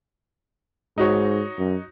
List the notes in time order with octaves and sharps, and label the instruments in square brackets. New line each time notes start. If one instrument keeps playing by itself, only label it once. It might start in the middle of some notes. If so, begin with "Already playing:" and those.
[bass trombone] G#2 [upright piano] D#4 F#4 C#5
[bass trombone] F#2